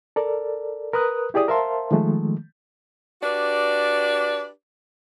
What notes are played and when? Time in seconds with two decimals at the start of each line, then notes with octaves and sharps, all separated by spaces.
0.16 A4 A#4 D5
0.93 A#4 B4 D#6 F#6
1.34 E4 G4 G#4 D5 D#6
1.48 A#4 C5 E5 F5 A5 C6
1.91 D#3 F3 G#3 A3
3.21 D4 F#4 G4 B4 D5